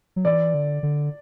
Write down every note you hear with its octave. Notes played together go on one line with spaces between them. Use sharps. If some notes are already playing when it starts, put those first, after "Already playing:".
F#3
E3 D5
D3
D3